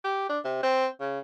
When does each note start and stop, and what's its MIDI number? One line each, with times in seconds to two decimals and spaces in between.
0.04 0.28 67
0.29 0.39 62
0.44 0.60 48
0.63 0.87 60
1.00 1.19 49